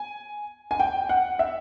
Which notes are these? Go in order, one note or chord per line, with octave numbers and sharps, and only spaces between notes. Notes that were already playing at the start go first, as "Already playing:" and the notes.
Already playing: G#5
G#5
G5
F#5
E5